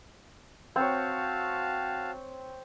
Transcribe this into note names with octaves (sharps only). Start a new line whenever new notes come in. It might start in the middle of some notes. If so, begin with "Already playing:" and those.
C4 F#4 C#5 F5 A5